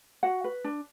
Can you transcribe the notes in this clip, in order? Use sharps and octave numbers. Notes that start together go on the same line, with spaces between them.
F#4 F#5
B4
D4